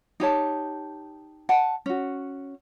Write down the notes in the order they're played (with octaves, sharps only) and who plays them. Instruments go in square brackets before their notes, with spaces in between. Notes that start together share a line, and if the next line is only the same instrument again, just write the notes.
[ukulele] D#4 G4 C#5 A5
F#5 A5
C#4 F#4